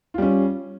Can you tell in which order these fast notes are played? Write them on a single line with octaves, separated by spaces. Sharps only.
F4 G3 C#4